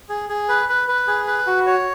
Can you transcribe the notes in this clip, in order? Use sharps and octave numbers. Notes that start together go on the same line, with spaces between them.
G#4
G#4
B4
B4
B4
G#4
B4
F#4
C#5